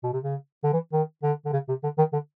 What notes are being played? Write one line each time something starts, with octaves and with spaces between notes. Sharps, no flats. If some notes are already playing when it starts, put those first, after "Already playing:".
B2
C3
C#3
D3
E3
D#3
D3
D3
C#3
C3
D3
D#3
D3